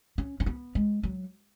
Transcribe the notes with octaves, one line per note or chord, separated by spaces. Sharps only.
C#4
C#4
B3
G#3
F#3